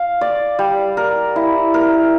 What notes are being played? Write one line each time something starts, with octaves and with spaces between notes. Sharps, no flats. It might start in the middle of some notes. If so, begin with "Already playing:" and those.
Already playing: F5
D5
G3
A#4
E4
A#4